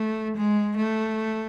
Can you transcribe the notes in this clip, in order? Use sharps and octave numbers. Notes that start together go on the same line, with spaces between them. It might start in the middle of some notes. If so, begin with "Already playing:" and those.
Already playing: A3
G#3
A3